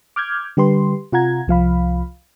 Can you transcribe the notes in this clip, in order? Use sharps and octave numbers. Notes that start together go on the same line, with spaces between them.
D6 F6 G6 G#6
D3 G3 G4 B4 C6
C3 F4 F#5 A#5 G#6
C2 F3 F5 B5